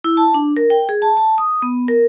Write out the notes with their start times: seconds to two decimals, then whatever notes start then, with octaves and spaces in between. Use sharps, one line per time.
0.04 E4
0.17 A5
0.34 D4
0.57 A#4
0.70 G5
0.89 G#4
1.02 A5
1.17 A5
1.38 D#6
1.62 B3
1.88 A#4